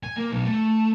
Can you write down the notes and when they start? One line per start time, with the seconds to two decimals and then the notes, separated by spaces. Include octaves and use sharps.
0.03 G#5
0.17 A#3
0.30 B1
0.46 A3